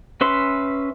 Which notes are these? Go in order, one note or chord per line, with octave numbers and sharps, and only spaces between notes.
C#4 B4 E5 C6